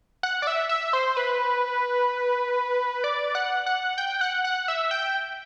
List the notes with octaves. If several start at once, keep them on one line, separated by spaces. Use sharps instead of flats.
F#5
D5
E5
E5
C5
B4
D5
F#5
F#5
G5
F#5
F#5
E5
G5